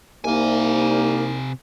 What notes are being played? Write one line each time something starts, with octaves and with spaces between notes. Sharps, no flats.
C2 C3 A#3 D#4 G#5